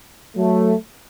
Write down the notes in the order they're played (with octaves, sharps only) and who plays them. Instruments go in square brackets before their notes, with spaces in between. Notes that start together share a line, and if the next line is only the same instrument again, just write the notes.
[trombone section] F#3 A3